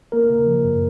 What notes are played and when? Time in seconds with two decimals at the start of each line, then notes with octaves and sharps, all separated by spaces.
0.12 A#3 A#4
0.30 C#3
0.47 F3
0.64 F#2